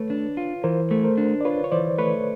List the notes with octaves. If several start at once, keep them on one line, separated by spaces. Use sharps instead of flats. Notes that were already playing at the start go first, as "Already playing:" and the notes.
Already playing: A3 B4 C#5
D4
F4
E3 A#4 C5
A3
A#4 C5
D4
D5
F4 B4 C#5
C#5
E3 C5 D5
A3 B4 C#5